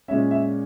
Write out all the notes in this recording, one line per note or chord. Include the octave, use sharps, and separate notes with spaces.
A#2 G#3 C#4 E5
E5